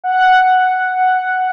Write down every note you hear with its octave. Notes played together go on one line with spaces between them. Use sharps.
F#5